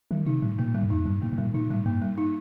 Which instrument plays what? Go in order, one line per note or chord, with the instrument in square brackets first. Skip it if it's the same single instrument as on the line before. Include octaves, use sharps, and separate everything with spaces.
[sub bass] D#3 [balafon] G3
[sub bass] C3 [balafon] D#4
[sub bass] A2 [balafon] G3
[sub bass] A#2 [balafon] A#3
[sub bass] A2 [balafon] G3
[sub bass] G2
[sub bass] F2 [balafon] D#4
[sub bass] G2 [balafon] G3
[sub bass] A2 [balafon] A#3
[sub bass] A2
[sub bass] A#2 [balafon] G3
[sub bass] A#2 [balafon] D#4
[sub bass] A2 [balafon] G3
[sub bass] G2 [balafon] A#3
[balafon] G3
D#4